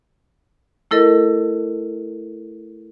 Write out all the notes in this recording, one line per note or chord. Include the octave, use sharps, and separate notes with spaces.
A3 E4 A4 A#4 D#5